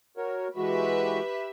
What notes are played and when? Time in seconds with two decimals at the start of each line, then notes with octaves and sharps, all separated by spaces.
0.17 F#4 A#4 C#5
0.57 E3 G#3 F#4 G4 B4 E5